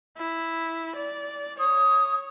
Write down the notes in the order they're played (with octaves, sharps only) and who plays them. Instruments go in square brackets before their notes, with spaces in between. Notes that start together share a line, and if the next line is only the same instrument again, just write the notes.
[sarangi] E4
D5
[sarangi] C#5 [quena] D#6